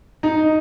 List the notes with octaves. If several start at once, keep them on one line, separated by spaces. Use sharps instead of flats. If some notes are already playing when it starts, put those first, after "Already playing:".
D#4